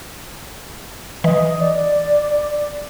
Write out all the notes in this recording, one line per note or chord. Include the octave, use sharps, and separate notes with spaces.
E3 D#5
D5